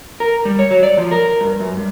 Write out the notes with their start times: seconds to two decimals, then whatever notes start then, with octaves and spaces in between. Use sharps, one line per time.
0.20 A#4
0.45 G3
0.59 C#5
0.71 F#3
0.83 D5
0.97 F3
1.11 A#4
1.41 G2
1.60 F#2
1.77 G2